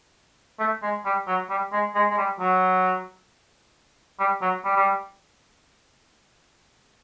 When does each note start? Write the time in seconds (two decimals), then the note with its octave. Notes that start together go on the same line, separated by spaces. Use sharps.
0.59 A3
0.82 G#3
1.05 G3
1.27 F#3
1.50 G3
1.72 G#3
1.95 G#3
2.10 G#3
2.18 G3
2.40 F#3
4.20 G3
4.42 F#3
4.64 G3
4.76 G3